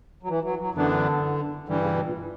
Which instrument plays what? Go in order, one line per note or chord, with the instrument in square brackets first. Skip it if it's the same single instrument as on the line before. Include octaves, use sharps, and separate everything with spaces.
[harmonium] F#3
E3
F#3
F#3
[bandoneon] F#2 E3 B3 D4 [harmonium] D3
[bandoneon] G2 E3 G3 [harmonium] D3
[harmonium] C#3
B2
A#2